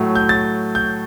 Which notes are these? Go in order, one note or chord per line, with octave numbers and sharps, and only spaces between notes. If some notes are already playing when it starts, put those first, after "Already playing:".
Already playing: A2 F#3 A3
G6
A6
G6